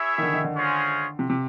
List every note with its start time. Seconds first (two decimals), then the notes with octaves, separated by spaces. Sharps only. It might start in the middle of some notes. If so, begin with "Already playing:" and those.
Already playing: E4 G#4 C#5 E5
0.18 D#3
0.23 D3
0.33 D#3
0.44 D3
0.55 G#3 C#4 F4 G#4 C5
1.19 C3
1.30 C3